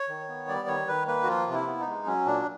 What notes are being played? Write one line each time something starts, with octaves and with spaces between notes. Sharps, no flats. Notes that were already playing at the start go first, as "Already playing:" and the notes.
Already playing: C#5
D#3
B3
G3 D5
D#3 C#5
D#3 B4
A#3 B4
F#4
F3 F4
C3
E4
B3
D#4
G#3
F#3 C#4
A#2 D4